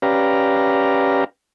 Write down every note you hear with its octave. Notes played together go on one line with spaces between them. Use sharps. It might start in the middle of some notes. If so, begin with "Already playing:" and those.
C#4 G4 B4 D5 F5 A#5